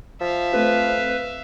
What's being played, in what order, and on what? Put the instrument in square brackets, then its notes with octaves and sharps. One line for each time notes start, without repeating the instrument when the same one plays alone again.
[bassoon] F3 [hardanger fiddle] E5 F5
[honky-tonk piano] A3 C4 [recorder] B4